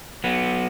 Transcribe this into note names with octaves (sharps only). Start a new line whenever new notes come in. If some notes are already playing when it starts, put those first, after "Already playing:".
F#3 B3